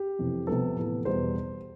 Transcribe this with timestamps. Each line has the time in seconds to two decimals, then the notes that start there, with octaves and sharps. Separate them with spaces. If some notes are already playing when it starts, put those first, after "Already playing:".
Already playing: G4
0.19 F2 C3 E3
0.47 C3 F3 B3 A4
0.76 A2 E3 B3
1.05 E2 B2 G3 B3 C5